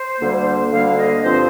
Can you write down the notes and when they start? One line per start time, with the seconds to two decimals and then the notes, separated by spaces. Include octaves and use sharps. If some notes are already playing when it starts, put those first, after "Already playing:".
Already playing: C5
0.20 D2 D3 G3 A#3
0.72 D2 D3 G3 A#3 F5
0.98 D#5
1.24 G2 F3 C4 C5